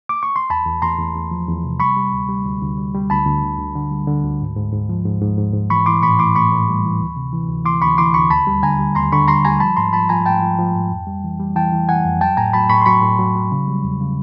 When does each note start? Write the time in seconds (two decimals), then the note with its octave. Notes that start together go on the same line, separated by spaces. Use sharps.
0.09 D6
0.23 C#6
0.36 C6
0.50 E2 A5 B5
0.66 E2
0.82 E2 A#5 C6
0.99 E2
1.16 E2
1.31 F3
1.48 E2
1.64 C3
1.80 G3 B5 C#6
1.97 G3
2.13 D2
2.29 G3
2.45 D2
2.62 D2
2.78 G3
2.95 G3
3.10 D2 A5 B5
3.27 D2
3.43 D3
3.59 D2
3.75 D3
3.91 G3
4.07 D3
4.24 D2
4.41 G#2
4.57 G#2
4.73 G#2
4.89 F3
5.05 G#2
5.21 G#2
5.38 G#2
5.54 G#2
5.70 E3 B5 C#6
5.86 E3 C6 D6
6.02 A2 B5 C#6
6.19 E3 C6 D6
6.35 A2 B5 C#6
6.51 A2
6.68 G3
6.85 E3
7.01 D2
7.16 C3
7.33 E3
7.49 D2
7.65 E3 C6 D6
7.82 D2 B5 C#6
7.98 E3 C6 D6
8.14 D2 B5 C#6
8.30 D#2 A5 B5
8.47 G3
8.63 D3 G#5 A#5
8.79 G3
8.95 D#2 A#5 C6
9.12 D3 B5 C#6
9.28 G3 A#5 C6
9.45 G3 G#5 A#5
9.60 F3 A5 B5
9.77 G#2 A#5 C6
9.93 F3 A5 B5
10.09 F3 G#5 A#5
10.26 G#2 G5 A5
10.42 F3
10.59 F3
10.75 G#2
10.91 F2
11.07 G3
11.24 E3
11.40 G3
11.56 E3 G5 A5
11.72 E3
11.88 E3 F#5 G#5
12.05 F2
12.21 F#3 G5 A5
12.37 A2 G#5 A#5
12.53 F#3 A5 B5
12.70 A2 B5 C#6
12.81 C6
12.86 F#3 B5 C#6
13.02 A2
13.19 F#3
13.35 F#3
13.52 C#3
13.68 G3
13.84 E2
14.00 C#3